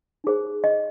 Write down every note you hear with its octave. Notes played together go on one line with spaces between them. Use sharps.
D#4 G#4 C5
D#5